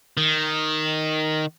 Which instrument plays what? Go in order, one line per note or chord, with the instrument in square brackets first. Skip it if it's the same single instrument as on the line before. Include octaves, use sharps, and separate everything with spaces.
[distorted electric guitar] D#3